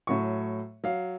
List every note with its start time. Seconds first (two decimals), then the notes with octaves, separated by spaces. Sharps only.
0.07 A2 F#3 C#6
0.84 F#3 F5